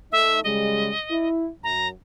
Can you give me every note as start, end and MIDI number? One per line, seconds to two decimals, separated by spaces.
0.12 0.42 57
0.12 0.42 63
0.12 0.40 76
0.44 0.91 49
0.44 0.91 55
0.44 0.91 56
0.44 1.28 75
1.11 1.49 64
1.64 1.92 42
1.64 1.88 82